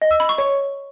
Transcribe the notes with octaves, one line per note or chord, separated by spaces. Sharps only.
D#5
E6
B5
C#6
C#5